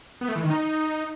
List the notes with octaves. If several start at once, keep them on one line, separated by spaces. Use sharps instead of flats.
B3
A3
E3
D#3
D#4